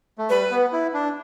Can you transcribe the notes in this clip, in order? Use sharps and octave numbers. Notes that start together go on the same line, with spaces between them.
A3
G3 B4
B3
E4
D4